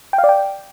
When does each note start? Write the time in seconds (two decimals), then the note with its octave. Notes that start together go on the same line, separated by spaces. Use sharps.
0.13 G5
0.18 F5
0.24 D5
0.29 G5